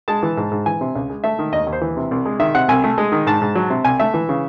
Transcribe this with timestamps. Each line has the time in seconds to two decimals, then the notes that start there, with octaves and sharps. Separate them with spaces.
0.08 G#3 A5
0.23 E3
0.37 G#2
0.52 G#2
0.66 E3 G#5
0.81 C3
0.95 C#2
1.10 G#3
1.24 A3 E5
1.39 D#3
1.53 D#2 D#5
1.67 D#2
1.72 C5
1.81 E3
1.97 C3
2.11 C2
2.25 G#3
2.39 D#3 E5
2.54 C3 F#5
2.68 C2 G#5
2.84 A3
2.98 G#3
3.12 D#3
3.27 G#2 A5
3.42 G#2
3.55 F#3
3.70 C3
3.84 C2 G#5
4.00 A3 E5
4.14 E3
4.29 C#3